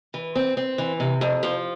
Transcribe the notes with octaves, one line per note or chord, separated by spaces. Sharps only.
E3
C4
C4
E3
C3
F2
F3